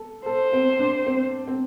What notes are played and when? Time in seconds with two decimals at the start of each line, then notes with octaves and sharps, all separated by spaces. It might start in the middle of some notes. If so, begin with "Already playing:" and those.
Already playing: A4
0.26 A4 C5
0.53 C4
0.79 D4
1.07 C4
1.48 C4